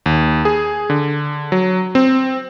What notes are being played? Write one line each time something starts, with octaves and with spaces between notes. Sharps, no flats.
D#2
G#4
D3
F#3
C4